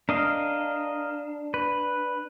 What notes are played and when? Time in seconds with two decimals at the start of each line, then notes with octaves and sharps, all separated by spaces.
0.09 D4 A#4 D#5 F5
1.54 B4